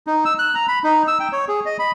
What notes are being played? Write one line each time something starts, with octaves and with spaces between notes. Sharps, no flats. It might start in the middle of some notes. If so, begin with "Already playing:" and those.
D#4
E6
F#6
A#5
B5
D#4
E6
G5
C#5
G#4
D#5
B5